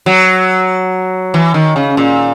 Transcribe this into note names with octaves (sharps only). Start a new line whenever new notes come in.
F#3
E3
D#3
C#3
A#2